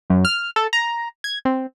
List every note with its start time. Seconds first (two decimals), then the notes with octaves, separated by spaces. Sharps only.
0.10 F#2
0.25 F6
0.56 A4
0.73 A#5
1.24 G#6
1.45 C4